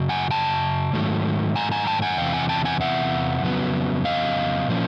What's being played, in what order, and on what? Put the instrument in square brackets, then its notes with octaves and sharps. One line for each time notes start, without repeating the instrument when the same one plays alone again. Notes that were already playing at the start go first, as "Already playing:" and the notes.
Already playing: [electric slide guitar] F#2 C#3 F#3
F#5 G#5
G5 A5
G#2 D#3 F#3 A3
G#5 A#5
G#5 A#5
G5 A5
F#5 G#5
E2 C3 E3 F5 G5
F#5 G#5
G5 A5
F#5 G#5
E5 F#5
F2 C#3 F#3 B3
D#5 F5
A#2 F3 A#3 C#4